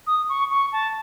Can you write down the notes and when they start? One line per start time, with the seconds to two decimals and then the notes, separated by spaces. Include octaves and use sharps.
0.07 D#6
0.29 C#6
0.51 C#6
0.72 A5